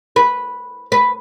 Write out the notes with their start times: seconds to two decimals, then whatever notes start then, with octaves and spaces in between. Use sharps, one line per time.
0.16 B4
0.92 B4